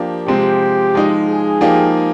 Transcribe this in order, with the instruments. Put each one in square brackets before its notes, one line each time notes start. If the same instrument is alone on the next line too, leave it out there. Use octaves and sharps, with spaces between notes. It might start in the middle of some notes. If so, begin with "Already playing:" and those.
Already playing: [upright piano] F3 A#3 D4 G4
[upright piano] C3 F3 G#3 C4 [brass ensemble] G4
[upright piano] F3 G#3 D#4
[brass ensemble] G#4
[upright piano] F3 A#3 D#4 G4